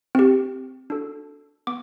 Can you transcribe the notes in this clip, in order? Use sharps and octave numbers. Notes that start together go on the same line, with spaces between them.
C4 G4
D4 F#4 A4
B3 D6